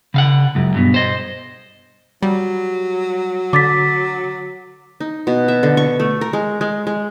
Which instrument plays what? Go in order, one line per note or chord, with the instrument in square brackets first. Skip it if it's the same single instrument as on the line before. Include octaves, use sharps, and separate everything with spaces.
[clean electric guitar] C#3 F5 F#5
C#2 F#2
G2 B2
C5 D#5
[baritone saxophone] F#3 [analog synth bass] G3
[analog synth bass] D3 [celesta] D6 A6 B6
[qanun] D#4
B2
E5
D3
C#6
A3
A#4
G#3
G#3
G#3